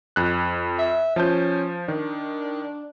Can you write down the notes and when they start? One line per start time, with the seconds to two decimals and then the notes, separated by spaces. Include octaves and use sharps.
0.16 F2 F#6
0.79 E5
1.16 F3 C#4 A5 G6
1.88 D#3 D4